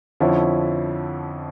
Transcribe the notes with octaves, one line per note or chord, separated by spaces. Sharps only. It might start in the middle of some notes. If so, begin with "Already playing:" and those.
F2 D3 F3 C#4 E4